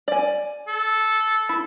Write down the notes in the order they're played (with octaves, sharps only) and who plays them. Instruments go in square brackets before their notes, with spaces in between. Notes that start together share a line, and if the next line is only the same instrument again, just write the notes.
[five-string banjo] D5 G#5
[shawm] A4
[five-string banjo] E4